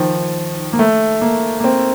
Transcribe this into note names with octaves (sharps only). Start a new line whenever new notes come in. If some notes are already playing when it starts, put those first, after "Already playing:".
Already playing: D#3 F3
A#3
A3
A#3
A#3
C4